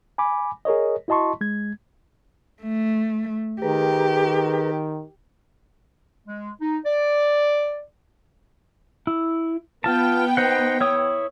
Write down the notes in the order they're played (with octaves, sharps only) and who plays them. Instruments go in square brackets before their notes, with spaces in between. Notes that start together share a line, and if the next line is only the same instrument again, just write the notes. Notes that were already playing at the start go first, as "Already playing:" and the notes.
[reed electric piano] G#5 B5 D6
G#4 A#4 C#5 D#5
E4 F#4 D#5 A5 C6 C#6
G#3 G#6
[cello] A3
[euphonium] D#3 [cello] G4 [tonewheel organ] G#4 B4 A#5
[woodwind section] G#3
D#4
D5
[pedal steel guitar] E4
[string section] B3 G5 [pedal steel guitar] F4 A5
[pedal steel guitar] D#4 C5 F#5
E4 C#5 D#6